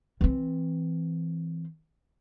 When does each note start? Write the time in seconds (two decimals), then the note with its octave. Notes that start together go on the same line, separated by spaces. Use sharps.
0.21 E3 C4